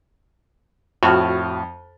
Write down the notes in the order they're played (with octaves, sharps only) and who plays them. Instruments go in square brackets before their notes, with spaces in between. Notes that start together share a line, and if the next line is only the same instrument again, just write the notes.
[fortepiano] F2 F6 [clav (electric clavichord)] A2 [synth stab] F#4